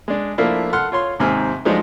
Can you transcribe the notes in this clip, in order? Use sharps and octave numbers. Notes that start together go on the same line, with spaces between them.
G#3 D4
F3 A3 A#3 D4 E4 F4
A4 F#5 C6 F6
F4 C#5 C6
D#2 G#2 C3 C4 G#5 F6
F3 F#3 G#3 A3 D4 D#4